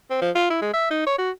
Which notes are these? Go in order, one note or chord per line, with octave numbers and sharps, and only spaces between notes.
C4
F3
F4
E4
G#3
E5
D#4
C#5
F#4